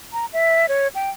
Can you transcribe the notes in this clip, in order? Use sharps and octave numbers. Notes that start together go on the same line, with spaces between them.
A#5
E5
C#5
G5